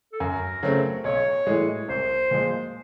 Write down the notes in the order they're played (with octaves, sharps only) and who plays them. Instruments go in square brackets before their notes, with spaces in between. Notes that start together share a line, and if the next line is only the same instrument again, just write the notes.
[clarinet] A4
[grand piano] F#2 [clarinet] A#4
[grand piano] C#3 F#3 A3 C4
[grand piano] B1 [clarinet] C#5
[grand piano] A2 E3 G#3
[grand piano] C2 [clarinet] C5
[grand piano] A#2 F3 G#3